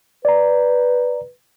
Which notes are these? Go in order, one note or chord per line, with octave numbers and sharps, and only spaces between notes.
B4 D5 A#5